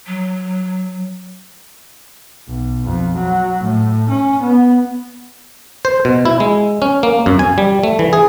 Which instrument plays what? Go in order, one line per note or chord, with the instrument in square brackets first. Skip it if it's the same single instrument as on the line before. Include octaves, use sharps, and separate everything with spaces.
[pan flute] F#3
[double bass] B1
F2
F#3
A2
C#4
B3
[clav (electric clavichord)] C5
B2
E4
G#3
C#4
A#3
F#2
G#5
G3
A3
E3
G#4